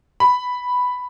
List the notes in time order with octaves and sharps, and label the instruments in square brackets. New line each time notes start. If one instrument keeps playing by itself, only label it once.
[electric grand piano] B5